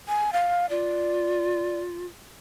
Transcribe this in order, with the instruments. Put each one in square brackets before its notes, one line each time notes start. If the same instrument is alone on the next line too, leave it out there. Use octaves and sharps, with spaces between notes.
[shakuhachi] G#5
F5
[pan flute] F4 [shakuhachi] D5